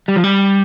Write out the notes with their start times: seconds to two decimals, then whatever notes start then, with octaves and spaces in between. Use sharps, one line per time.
0.08 G3
0.16 F3
0.24 G3